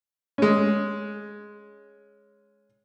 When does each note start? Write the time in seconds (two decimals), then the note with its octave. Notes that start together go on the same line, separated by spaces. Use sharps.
0.38 G#3 C#4